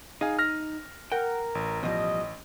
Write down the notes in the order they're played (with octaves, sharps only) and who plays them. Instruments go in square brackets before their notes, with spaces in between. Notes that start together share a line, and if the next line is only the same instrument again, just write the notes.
[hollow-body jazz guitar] D#4 [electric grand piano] G#4 F5 G#5
[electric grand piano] F6 A#6
[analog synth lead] A#4 [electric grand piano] F#5 [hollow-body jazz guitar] G5
[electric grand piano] A1
[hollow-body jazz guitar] B2 F3 G3 [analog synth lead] D#5